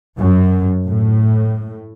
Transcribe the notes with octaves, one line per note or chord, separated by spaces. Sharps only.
F#2
A2